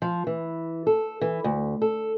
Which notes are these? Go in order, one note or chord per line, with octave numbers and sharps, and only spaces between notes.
F3
E3
A4
E3
D2
A4